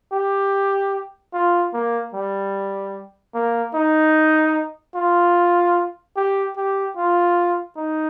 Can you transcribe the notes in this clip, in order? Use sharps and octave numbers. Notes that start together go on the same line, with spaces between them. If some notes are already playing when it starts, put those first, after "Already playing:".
G4
F4
A#3
G3
A#3
D#4
F4
G4
G4
F4
D#4